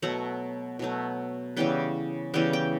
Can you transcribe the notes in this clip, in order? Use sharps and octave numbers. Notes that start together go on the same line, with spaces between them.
B2 F#3 A3 F#5
B2 F#3 A3
C#3 E3 G3 B3 G5
C#3 E3 G3 B3 G5
G5